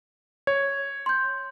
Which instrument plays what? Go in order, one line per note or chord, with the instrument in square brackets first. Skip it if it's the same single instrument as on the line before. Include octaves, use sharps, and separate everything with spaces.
[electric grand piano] C#5 [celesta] G#6
[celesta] C6 G6